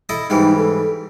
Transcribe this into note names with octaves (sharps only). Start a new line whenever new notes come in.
E4 A4 D#5
G#2 E3 G3 D#4
A4